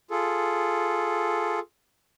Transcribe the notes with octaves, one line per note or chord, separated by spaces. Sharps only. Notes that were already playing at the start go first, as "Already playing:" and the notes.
F4 G#4 A4